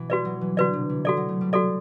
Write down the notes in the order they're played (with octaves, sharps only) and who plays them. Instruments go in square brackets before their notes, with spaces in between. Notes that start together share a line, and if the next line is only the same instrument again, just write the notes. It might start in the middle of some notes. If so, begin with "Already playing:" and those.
Already playing: [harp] B2 E3
[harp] G3 [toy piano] F#4 B4 D5
[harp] F#3
E3
[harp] D3 [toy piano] F#4 B4 D5
[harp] C3
E3
[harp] F#3 [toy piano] F#4 A4 D5
[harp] F#3
A3
G3
[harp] G3 [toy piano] F#4 A4 D5